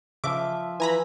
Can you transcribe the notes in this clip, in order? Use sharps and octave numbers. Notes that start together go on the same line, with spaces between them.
C#3 F3 E5 D6
E3 G#5 A#5 B5